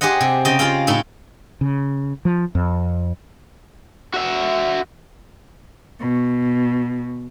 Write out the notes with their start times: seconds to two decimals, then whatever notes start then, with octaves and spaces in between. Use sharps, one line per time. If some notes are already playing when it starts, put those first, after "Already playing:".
0.01 G4 G#4 C5 D#5 F#5
0.21 C3
0.45 C#3 D#5 G5
0.59 F4 G#4 F5 G5
0.87 A2 A3 D#4 E4
1.61 C#3
2.25 F3
2.55 F2
4.14 F#4 E5
6.00 B2